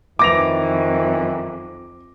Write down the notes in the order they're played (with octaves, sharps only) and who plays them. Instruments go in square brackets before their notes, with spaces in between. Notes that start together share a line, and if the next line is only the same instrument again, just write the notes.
[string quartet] F2 [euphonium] D#3 [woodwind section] E3 [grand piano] D6 A#6 F7